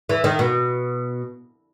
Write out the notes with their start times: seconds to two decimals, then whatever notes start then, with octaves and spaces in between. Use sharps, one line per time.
0.09 E3
0.24 D#3
0.39 B2